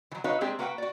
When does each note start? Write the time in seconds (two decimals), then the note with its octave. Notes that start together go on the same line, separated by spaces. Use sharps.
0.11 E3 F#3
0.24 D#4 F#4 B4 C#5 D#5 F5
0.41 G#3 A#3 C4 D4 G4 G#4
0.59 A#3 F#4 B4 D#5 F#5 G5
0.78 F#4 D5